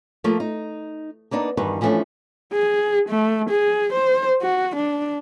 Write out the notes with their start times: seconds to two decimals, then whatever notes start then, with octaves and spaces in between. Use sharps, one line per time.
0.24 F3 A3 A#3 F4
0.40 D#4
1.31 A#3 B3 D4 D#4
1.57 E2 G2 D#3 B4
1.81 E3 F3 G3 A3 C#4 D4
2.53 G#4
3.09 A3
3.50 G#4
3.94 C5
4.42 F#4
4.76 D4